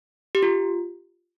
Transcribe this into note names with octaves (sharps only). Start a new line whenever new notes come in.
G4
F4